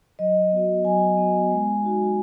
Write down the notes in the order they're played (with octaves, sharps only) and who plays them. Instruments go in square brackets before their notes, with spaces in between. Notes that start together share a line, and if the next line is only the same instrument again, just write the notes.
[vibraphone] F#3 D#5
B3 F#4
F#3 G#5
B3 F#4
G#3
D#4 F#4